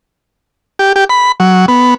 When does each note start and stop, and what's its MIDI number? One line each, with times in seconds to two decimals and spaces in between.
0.79 0.93 67
0.96 1.04 67
1.10 1.32 83
1.40 1.66 54
1.68 1.94 59